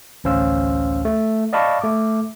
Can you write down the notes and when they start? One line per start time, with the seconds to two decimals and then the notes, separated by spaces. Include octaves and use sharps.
0.24 A1 D2 C#4 C5 F5 E6
1.05 A3
1.53 D5 D#5 F5 A5 B5 C#6
1.82 A3 D6